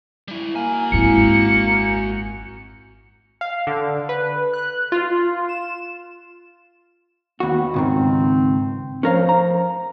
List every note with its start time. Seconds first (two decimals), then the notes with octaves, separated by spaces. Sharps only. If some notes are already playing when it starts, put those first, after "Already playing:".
0.28 G3 E4
0.56 A#3 F#4 G#5
0.92 G#1 E4 C#7
3.41 F5
3.67 D3
4.09 B4
4.54 F#6
4.92 F4
5.49 E7
7.40 D#2 B3 F#4
7.74 C#2 G#2 D#3 C4
9.03 F3 C#4 A#4 F5
9.29 A#5